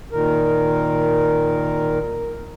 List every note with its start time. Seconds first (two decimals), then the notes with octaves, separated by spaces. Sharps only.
0.12 A#2 D#3 A#4